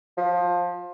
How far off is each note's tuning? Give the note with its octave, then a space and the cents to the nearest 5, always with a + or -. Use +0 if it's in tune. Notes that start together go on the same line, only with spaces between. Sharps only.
F3 +20